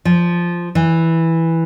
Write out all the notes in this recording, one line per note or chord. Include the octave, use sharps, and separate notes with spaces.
F3
E3